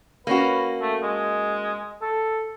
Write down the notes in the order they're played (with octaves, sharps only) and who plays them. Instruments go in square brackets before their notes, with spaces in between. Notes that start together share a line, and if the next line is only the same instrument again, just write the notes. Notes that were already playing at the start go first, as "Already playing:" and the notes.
[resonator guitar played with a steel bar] A#3 C#4 F#4 [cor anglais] B4
[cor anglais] A3
G#3
A4